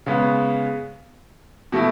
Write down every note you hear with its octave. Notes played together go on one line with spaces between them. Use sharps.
C#3 G#3 B3
B2 A3 E4